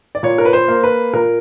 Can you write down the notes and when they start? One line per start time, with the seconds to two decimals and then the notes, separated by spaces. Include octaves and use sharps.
0.15 D5
0.23 A#2 C#5
0.38 A#4
0.45 B4
0.53 C5
0.68 A#3
0.84 B4
1.13 A#2 A#4